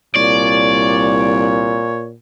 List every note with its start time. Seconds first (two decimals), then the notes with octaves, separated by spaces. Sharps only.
0.15 C2 A#2 C#5 D5